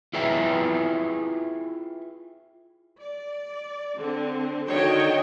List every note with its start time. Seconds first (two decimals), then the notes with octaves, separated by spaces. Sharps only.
0.13 E4 F4 G#4 B4 E5 G5
2.99 D5
3.96 D3 C4
4.68 D3 D#3 F#4 C#5 D#5 G5